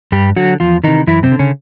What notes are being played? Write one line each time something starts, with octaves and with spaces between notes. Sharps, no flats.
G2 G3 G4
D3 F#3 F#4
E2 F3 F4
C3 D#3 E3 D#4
F#2 E3 E4
C3 C4
D3
C#3 C#4